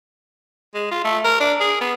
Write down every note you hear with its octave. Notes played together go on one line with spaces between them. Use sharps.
G#3
F4
A3
A#4
D4
G#4
B3